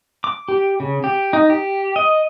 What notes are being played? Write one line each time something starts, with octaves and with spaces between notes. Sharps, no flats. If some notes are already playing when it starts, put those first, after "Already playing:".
D6
G4
C#3
G4
D#4
G4
D#5